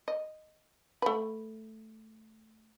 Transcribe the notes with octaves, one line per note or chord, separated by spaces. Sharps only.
D#5
A3 B4